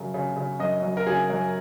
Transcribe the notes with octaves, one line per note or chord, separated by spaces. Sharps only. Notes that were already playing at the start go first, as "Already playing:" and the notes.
Already playing: F#2 C#3
C#3
C#3
F#2 D#5
F#2
A#4
C#3 G#4
F#2